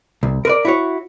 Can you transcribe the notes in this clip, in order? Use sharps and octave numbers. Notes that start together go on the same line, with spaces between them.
C2
A#4 B4 D5
E4 F#4 C#5